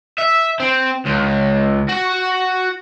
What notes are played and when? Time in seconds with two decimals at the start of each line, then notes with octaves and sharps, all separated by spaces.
0.18 E5
0.60 C4
1.06 C#2
1.89 F#4